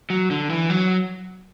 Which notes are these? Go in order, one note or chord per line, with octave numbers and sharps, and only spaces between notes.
F#3
D3
E3
F#3